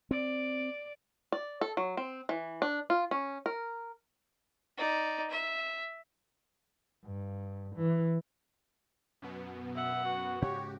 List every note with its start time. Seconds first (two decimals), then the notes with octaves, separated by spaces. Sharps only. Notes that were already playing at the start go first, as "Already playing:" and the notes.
0.11 C4 D5
1.32 D5
1.61 A4
1.77 F#3
1.97 C4
2.29 E3
2.62 D4
2.90 F4
3.11 C#4
3.46 A#4
4.78 D#4 D5
5.30 E5
7.05 G2
7.76 E3
9.22 F#2 B2 B3
9.76 E5 F#5
10.05 F#4
10.42 G#2 C#3 C#4 F#4 G4 C#5